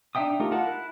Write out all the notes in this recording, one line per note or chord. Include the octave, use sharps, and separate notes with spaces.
D4 D#4 E5 G5 D#6
A3 D#4 F4 G4 A#4
F4 A#4 F#5 A5
E4 F#6